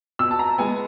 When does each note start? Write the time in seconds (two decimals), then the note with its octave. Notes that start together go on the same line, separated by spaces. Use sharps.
0.19 B2 E6
0.31 A5
0.39 A#5
0.58 G#3 B3 G#5